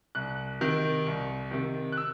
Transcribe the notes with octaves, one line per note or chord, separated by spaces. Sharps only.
C2 F#6
C3 D#3
C2
C3 D#3
F#6
E6